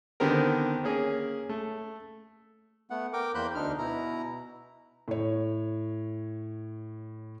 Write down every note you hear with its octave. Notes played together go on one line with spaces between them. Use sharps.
D3 D#3 B3 C4 G4 A#4
A#3 C#4 G#4
A3
A3 B3 F#5
A#4 G5 D6
E2 A#3 C5 B5 F#6 G6
D2 D4 D#4 F6
B2 E4 A#5
A2 C#5